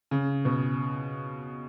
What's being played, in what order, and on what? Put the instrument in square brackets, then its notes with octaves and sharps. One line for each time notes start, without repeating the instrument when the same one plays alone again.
[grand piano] C#3
B2